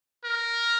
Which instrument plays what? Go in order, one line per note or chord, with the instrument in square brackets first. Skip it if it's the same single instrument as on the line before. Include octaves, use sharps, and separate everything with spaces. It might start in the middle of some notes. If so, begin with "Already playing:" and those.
[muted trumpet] A#4